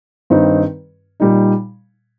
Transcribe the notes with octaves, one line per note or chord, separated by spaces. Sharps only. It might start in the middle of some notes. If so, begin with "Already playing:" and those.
G2 D#3 C4 D#4
A#2 G3 D#4